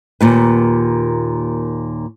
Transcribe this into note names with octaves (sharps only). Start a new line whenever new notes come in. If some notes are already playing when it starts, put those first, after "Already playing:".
D#2 A#2 B4